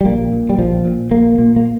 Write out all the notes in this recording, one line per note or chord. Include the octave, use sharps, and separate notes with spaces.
G3
A#1 A#3
A#2
G3
A#1 F3
A#2
A#1 A#3
A#2 A#3
A#3